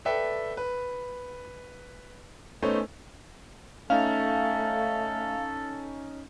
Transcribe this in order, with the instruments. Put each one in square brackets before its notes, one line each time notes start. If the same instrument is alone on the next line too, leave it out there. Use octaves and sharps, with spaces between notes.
[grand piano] A4 B4 D5 E5 G5
B4
A3 B3 C#4 D#4 C5
[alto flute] A3 [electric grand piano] C#4 D#4 [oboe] A4 [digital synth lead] F5